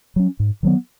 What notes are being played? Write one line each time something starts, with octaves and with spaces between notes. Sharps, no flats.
F#3 C#4
G#2
D#3 F#3 B3